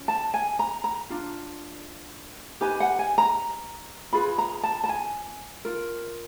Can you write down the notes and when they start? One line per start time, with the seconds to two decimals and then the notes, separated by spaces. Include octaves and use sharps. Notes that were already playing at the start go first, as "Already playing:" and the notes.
Already playing: C#4 F4
0.08 A5
0.34 G#5
0.59 A#5
0.84 A#5
1.10 D4 F4
2.61 D#4 G4 B4 G#5
2.80 F#5
2.99 G#5
3.18 A#5
4.13 F4 G#4 B4 B5
4.38 A#5
4.63 A5
4.84 A5
4.89 G#5
5.65 F4 A#4